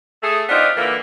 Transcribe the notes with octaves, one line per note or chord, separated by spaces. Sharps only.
A3 G#4
B3 C4 D4 D#4 F4
A#2 D3 E3 A#3